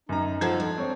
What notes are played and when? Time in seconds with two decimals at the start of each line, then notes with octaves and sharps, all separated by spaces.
0.09 F#2 D#4 A#5
0.41 F3 A4 F#5 G#6
0.60 D4
0.78 C4 C#5